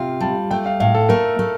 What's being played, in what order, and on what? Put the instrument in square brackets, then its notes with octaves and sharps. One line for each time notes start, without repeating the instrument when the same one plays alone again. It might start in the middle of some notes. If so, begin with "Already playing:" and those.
Already playing: [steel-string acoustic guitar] C3 F4 [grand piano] F5 G5
[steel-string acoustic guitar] G3 [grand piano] A5
[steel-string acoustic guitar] A3 [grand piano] G5
[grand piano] F5
[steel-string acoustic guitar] A2 [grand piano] F5
[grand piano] A4
[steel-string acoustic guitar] A3 [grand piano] A#4
[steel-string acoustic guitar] A3